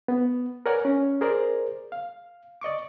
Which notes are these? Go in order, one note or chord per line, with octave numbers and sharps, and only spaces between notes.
B3
A#4 B4 C#5 D5 F#5 G#5
C#4
G#4 A#4 C5 D5
F5
D5 D#5 C#6 D6